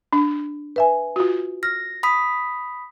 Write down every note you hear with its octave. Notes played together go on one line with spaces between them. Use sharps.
D4
B4 E5 G#5
F4 F#4
F6 A#6
B5 D#6 B6